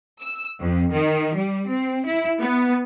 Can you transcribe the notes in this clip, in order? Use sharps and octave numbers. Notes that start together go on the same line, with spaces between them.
E6
F2
D#3
G3
C4
E4
B3